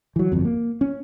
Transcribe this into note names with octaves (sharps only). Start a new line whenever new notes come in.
E3 F#3
G1 F2
A#3
C#4